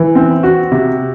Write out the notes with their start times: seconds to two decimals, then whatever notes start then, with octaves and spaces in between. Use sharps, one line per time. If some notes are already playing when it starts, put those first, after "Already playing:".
Already playing: E3
0.15 C4
0.43 F#4
0.72 C3